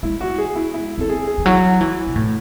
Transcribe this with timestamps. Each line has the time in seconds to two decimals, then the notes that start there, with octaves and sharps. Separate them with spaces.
0.03 G#3 E4
0.21 F#4
0.38 G#4
0.55 E4
0.74 E4
0.98 C4 A4
1.09 G#4
1.27 G#4
1.38 E3
1.45 F#3 E4
1.81 E3
2.07 C3
2.16 A2